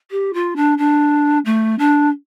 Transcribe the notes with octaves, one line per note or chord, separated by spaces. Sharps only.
G4
F4
D4
D4
A3
D4